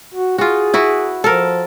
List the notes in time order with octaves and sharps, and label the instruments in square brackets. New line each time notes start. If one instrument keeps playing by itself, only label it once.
[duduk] F#4
[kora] F4 F#4 [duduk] G#4
[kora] E4 F#4 B4
[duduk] F3 [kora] A4 A#4